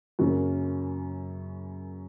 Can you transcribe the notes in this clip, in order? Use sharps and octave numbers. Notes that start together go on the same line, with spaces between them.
F#2 C#3 F#3 A#3 C#4